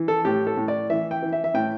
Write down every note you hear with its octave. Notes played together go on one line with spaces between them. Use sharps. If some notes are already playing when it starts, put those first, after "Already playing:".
Already playing: E3
A4
A2 G4
A4
A2
D5
E3 E5
G5
E3
E5
E5
A2 G5